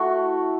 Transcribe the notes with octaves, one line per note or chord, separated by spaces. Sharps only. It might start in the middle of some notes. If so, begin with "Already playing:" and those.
Already playing: A3 E4 F#4